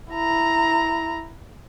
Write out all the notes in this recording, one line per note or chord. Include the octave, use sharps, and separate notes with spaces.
E4 A#5